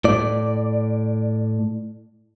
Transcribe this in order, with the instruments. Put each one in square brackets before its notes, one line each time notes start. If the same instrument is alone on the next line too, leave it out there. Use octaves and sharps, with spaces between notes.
[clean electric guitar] A2 D5